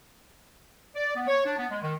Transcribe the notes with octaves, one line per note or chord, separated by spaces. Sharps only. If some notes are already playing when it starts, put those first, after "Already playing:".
D5
B3
C#5
D4
B3
G#3
D#3